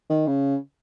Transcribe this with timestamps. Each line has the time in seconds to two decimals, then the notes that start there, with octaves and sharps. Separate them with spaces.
0.10 D#3
0.27 C#3